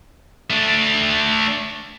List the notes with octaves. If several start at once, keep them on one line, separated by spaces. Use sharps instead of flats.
A3 D4